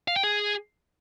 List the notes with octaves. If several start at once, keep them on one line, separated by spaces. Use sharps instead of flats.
F5
G5
G#4